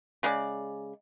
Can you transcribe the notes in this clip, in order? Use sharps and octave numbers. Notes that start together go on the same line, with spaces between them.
C#3 G#3 G#4 D5